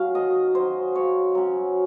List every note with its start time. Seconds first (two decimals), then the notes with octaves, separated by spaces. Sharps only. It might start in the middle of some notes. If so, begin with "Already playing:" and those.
Already playing: F#3 C#4 F5
0.14 D#3 D#5
0.55 F#3 C#4 C5
0.95 C#3 C#5
1.35 F#3 C#4